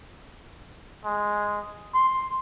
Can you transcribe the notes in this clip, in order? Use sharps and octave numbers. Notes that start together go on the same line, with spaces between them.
G#3
C6